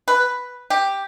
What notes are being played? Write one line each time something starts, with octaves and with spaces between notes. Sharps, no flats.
B4
G4